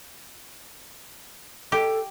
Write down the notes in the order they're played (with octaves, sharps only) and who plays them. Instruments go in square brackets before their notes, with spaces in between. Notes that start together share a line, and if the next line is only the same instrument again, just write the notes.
[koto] G4 [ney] A4